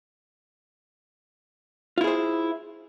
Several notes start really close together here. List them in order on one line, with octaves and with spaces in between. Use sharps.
F4 E4 G#4 C5